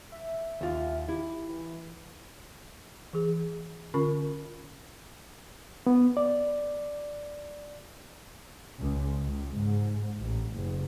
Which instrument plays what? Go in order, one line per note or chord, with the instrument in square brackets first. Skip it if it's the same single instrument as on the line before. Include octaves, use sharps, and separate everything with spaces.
[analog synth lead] E5
[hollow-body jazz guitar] D#2 F4
[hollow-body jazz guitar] E4 [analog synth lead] G4
[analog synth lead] E3
[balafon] E3 G#4
D3 C#4 F4 A#4 B5 C#6
[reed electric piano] B3
D5
[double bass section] C#2
C#2
G#2
A1
F#1